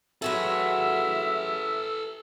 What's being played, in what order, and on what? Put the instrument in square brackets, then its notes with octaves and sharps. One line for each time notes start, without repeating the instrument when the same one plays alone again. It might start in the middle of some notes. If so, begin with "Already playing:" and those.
[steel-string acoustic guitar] F#3 F#4 G#4 [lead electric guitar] A4 B4 [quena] E5 [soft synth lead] E6